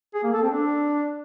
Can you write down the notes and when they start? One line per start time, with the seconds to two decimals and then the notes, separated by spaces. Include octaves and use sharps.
0.14 G#4
0.24 A#3
0.33 A4
0.42 C4
0.52 D4